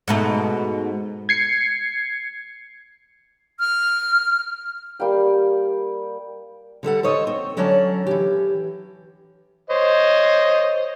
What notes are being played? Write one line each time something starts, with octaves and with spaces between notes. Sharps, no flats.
G#2 B2 A3
G#6 C7 C#7
F6
G3 A#3 G5
D3 G3 A4 F#5
A4 C5 C#5 D#5
C4
D3 F#3 C#4 C#5 D5 A5
E3 G4
C5 C#5 D#5